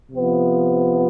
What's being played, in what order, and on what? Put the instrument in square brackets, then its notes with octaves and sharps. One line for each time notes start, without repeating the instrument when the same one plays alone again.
[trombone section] C3 F3 B3